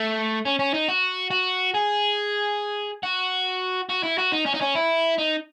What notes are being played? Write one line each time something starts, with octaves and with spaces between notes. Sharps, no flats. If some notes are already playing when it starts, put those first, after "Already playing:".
Already playing: A3
C#4
C#4
D#4
F#4
F#4
G#4
F#4
F#4
E4
F#4
D#4
C#4
D#4
C#4
E4
D#4